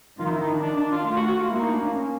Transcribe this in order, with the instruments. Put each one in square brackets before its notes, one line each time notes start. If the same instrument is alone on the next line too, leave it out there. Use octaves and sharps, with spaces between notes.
[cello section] D#3 [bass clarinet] F4
[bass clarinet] D#4
E4
D#4
D4
D4
D4
F4
[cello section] A3 [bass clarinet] F4
[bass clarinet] F#4
F#4
F4
[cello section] A#3 [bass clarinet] E4
[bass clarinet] D#4
D4
C#4